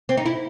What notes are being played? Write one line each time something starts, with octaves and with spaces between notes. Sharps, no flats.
C4
D#4
E4